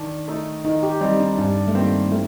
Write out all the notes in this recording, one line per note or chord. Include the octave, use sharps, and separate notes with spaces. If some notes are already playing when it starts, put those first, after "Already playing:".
Already playing: D#3 D4
A3 D#4 A4
D#3 D#4
G4
G3 C4 D#4
D4
G2 D4
A3
D#3 G3 A#3 C4 G4
D#3 A3